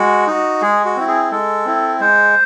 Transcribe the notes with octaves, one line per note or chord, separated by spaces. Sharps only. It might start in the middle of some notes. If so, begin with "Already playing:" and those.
Already playing: G#3 F#4
D#4 F#4
G#3 G#4
F#4
C4 E4
G#4
G#3 A4
C4 E4
G#3 C5